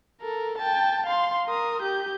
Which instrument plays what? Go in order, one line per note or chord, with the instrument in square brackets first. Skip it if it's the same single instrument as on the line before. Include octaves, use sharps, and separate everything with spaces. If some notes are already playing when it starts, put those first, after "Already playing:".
[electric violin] A4 A#4
G5 A5
F5 C6
A#4 D#6
G4 G6